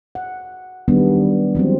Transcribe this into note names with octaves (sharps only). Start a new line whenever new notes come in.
F#5
D#3 F#3 G3 B3 C4 D4
E3 F#3 G#3 C4